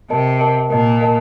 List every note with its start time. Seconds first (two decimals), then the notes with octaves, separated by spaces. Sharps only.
0.10 C3 A#4 D#5 A5
0.41 A#4 D#5 A5
0.70 A#2 A#4 D#5 A5
1.01 A#4 D#5 A5